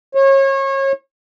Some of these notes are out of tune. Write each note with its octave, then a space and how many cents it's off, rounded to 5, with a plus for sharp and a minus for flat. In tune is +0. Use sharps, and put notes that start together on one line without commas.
C#5 -30